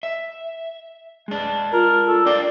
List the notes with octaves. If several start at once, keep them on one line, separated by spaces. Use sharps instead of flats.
E5
G#3 D4
F4 A#4
A4
D4 D5 F5 G5